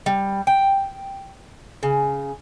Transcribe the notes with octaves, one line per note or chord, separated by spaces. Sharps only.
G3
G5
C#3